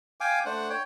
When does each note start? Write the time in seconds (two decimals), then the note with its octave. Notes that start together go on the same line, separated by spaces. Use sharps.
0.21 F5 G5 G#5 D6
0.45 A3 D4 C5 F#5
0.70 C#5 G5